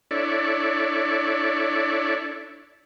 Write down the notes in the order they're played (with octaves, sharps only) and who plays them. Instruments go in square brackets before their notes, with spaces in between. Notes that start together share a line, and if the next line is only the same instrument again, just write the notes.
[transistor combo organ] D4 E4 A4 C#5 D5